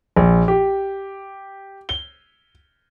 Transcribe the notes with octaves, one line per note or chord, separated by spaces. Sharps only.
A#1
G4
G7